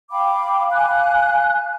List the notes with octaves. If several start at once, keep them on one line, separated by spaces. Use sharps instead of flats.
F5 G5 B5 D6
F5 G#5 F#6